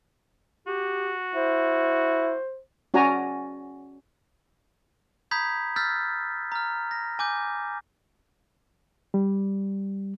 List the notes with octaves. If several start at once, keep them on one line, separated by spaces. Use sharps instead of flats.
F#4 G4
E4 C5
C#4 F#4 D5 G#5 A#5
A#5 B5 D#6 G6 G#6 B6
E6 F6 G6 A6 B6
A#5 F6
A#6
G#5 D6 G6
G3